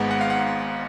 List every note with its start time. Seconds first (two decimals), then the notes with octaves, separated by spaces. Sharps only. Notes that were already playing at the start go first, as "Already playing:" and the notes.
Already playing: G#1 G#2 G#3 B3 F#5
0.11 F#5
0.21 F5
0.30 F#5